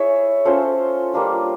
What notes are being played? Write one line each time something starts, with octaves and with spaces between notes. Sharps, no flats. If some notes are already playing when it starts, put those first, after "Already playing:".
Already playing: E4 G#4 C#5 E5
C#4 F4 A4 C5
G3 A#3 D4 F4